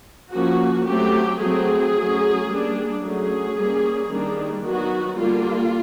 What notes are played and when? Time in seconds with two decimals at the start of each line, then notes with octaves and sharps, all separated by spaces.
0.33 F3 A#3 C#4 F#4
0.87 F#3 A3 C4 G4
1.41 F#3 A3 C4 G#4
1.95 F#3 A3 C#4
2.49 G3 A#3 D4
3.03 F#3 A3 C#4 G#4
3.57 G3 A#3 C#4
4.11 D#3 G3 A#3 D4
4.65 D#3 F#3 B3 F#4
5.18 D3 G3 A#3 F4